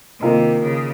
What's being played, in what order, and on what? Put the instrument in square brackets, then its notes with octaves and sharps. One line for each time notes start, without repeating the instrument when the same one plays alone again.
[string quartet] C3 [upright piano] D#3 A#3 F4 A#4 D#5
[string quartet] C#3